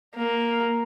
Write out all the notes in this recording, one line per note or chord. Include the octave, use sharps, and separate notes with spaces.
A#3